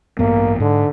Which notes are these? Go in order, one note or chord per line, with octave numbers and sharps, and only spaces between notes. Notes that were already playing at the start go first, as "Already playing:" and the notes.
A1 G2 A#3 B3
G#2 D3